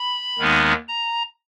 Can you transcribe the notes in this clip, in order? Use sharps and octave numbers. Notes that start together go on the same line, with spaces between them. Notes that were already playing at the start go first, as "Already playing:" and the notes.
Already playing: B5
D#2 D#3 G#3 B3 D#4
A#5